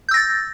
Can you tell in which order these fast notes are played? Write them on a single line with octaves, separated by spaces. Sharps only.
G6 E6 A#6 A6